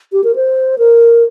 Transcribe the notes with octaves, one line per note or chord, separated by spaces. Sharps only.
G4
A#4
C5
A#4